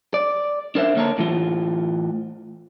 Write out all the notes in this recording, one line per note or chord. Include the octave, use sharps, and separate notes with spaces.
D5
D4 A#4 C5 E5
D3 A#3 C#5 A5 A#5
A2 E3 F4